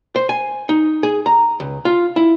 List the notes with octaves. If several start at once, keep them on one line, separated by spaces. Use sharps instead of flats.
C5
G#5
D#4
G#4
A#5
C#2
F4
E4